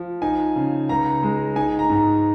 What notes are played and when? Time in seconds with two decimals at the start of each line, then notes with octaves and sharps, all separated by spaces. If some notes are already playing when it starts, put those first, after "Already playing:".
Already playing: F3
0.22 D#4 G#5
0.56 C#3
0.89 C#2 A#5
1.23 G#3
1.56 D#4 G#5
1.79 A#5
1.89 G#2